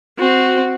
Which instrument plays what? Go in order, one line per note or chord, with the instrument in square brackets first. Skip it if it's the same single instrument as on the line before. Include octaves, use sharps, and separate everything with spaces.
[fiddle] C4 [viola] F#4